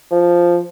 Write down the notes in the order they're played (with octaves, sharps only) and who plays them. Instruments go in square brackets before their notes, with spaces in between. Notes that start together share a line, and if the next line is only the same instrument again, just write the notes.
[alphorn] F3